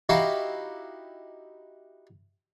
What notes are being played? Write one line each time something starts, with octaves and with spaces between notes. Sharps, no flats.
D#4 E4 F#4 G4 E5 F5